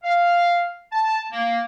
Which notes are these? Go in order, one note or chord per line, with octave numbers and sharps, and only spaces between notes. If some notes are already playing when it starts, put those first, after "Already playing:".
F5
A5
A#3